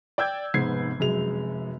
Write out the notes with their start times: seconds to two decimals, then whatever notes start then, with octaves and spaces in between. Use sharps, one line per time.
0.18 D5 G5 E6 G6 G#6
0.54 F1 G#2 B3 G#6 C7
1.00 F1 F#2 G#3 F7